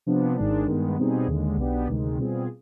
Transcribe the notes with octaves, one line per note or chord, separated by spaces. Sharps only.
C3 F3 B3 D4
G#1 G#2 D#3 G#3 D4
G2 D#3 G#3 B3
B2 G3 C4 D#4 G#4
D#2 D3 G#3
B1 B2 B3 D4 G4
D2 C3 D#3 G#3
B2 G3 C4 F4 G#4